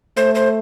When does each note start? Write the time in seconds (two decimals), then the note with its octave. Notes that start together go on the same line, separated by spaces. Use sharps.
0.17 A3 C5
0.35 C5